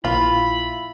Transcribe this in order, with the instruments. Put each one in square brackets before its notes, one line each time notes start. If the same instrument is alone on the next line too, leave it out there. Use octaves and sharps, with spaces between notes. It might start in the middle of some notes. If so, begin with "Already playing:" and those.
[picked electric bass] A#1 [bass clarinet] E4 [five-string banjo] F4 [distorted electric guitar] B5